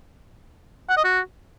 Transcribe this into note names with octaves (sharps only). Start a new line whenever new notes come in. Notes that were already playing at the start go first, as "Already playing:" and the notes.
F#5
D#5
F#4